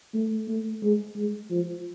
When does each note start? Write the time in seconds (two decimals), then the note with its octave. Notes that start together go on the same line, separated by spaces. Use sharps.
0.14 A3
0.48 A3
0.83 G#3
1.16 G#3
1.51 F3